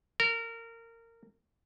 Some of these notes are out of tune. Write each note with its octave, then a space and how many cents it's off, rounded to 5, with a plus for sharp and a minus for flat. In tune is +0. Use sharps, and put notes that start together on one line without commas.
A#4 -20